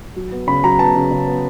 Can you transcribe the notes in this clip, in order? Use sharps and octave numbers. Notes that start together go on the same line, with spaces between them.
F#3
B3
C#3 B5
F#3 A#5
B3 A5
C#3
C#3
B3